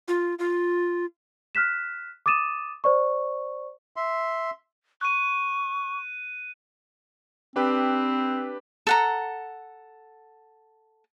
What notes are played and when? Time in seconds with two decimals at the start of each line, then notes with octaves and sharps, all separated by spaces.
0.08 F4
0.39 F4
1.55 F6 F#6 B6 E7
2.26 D6 D#6 A6 D#7 E7
2.84 C5 D5 C#6
3.96 E5 C6
5.01 C#6 F#6 D#7
7.56 C4 D4 G4 B4
8.87 A4 F#5 A#5